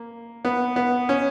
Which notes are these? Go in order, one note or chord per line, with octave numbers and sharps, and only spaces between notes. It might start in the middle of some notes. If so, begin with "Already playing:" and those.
Already playing: A#3
B3
B3
C#4